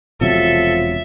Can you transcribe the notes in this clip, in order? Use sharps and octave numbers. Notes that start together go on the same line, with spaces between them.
E1 C3 F3 F#3 A4 E5